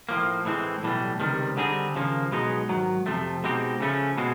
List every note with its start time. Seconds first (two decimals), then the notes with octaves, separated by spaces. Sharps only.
0.09 A2 F3 A#3
0.45 A2 E3 G#3 C4
0.82 B1 A2 E3 G3
1.20 C#2 C3 D#3 G3
1.57 D3 G3 C4 D#4 G#4
1.95 D#2 C#3 F3 A#3
2.31 B1 B2 G#3 B3 D#4
2.68 G#2 D#3 F#3
3.06 F2 C3 F3 A3
3.44 B2 G#3 C4 D#4 G4
3.80 C#3 F3 A3 C#4
4.18 B2 G#3 C4